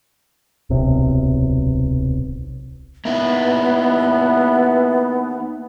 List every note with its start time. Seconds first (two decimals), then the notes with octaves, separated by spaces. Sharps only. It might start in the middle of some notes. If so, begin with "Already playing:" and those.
0.70 D1 B1 C3
3.05 A#3 B3 D#4 E4 B4